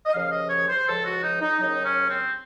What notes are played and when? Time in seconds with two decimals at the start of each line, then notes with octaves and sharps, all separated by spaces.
0.06 D#5
0.12 D#2 C#3 F3 F5
0.31 D#5
0.49 C#5
0.68 C5
0.86 C#2 C#3 F3 A4
1.05 F#4
1.23 D#4
1.42 D#4
1.60 D#2 C#3 F#3 D#4
1.85 C#4
2.09 C4